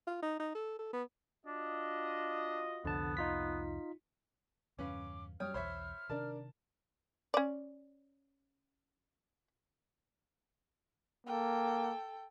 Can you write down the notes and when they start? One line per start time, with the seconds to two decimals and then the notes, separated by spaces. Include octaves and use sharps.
0.07 F4
0.22 D#4
0.39 D#4
0.54 A4
0.79 A4
0.93 B3
1.46 D4 F4 F#4 D#5
2.85 C2 F2 D3 B3 A5
3.17 D#4 F4 B6
4.79 E2 G2 C#3 C#4 B4 F5 D6
5.40 F#2 G3 C#5 G5 D#6 F6
5.54 B1 E2 C5 C#5 E5 B5
6.09 C3 D#3 D4 A#4 D5 A5
7.34 C#4 D5
11.27 A#3 A4 G5